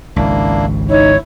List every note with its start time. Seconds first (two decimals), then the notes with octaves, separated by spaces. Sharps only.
0.16 G#1 C#2 A#3 D4 E4
0.90 D#4 E4 C#5